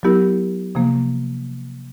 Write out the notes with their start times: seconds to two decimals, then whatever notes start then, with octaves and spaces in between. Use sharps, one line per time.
0.03 F#3 B3 E4 G4 A#4
0.75 C3 F3 A#3